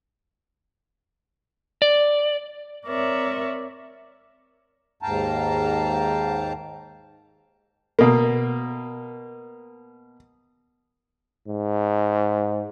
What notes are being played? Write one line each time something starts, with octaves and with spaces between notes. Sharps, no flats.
D5
C4 A#4 C#5 D5 E5 C#6
D#2 G#2 F5 G5 A5 A#5
B2 A#3
G#2